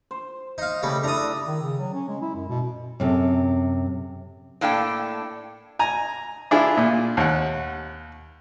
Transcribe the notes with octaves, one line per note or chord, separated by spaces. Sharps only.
C5
D#4 F5
C#3 G3 A3 D5
D4 E4 E5 A#5 D#6
D#3
C#3
F#3
C#4
G#3
E4
F#2
B2
F#2 C3 A4
A2 A#3 D4 A4 G5
G#5 A#5
D4 E4 F4 G#4
A#2
D#2 F#5